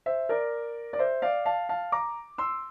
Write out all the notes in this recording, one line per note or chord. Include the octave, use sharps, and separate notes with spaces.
C5 E5
A#4 D5
D5
C5 E5
D5 F5
F5 A5
F5 A5
A#5 D6
C6 E6